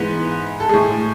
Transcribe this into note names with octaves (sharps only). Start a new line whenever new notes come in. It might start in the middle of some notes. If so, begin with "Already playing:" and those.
Already playing: G#2 E3 G#3 B3 B4
A4
A2 G#3 G#4